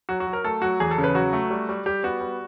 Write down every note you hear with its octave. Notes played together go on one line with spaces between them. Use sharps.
F#3 F#4
F#4
F#3
A#4
A3 A4
F#3 F#4
E2 G#4
A4
C#3
B4
F#3 F#4
A3
G3
G3
G3 G4
B3 F#4
G3